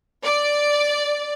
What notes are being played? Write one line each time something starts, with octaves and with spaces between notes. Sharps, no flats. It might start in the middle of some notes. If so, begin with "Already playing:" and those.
D5